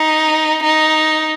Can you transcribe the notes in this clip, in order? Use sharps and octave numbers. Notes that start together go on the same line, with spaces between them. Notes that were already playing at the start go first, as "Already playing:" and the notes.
Already playing: D#4
D#4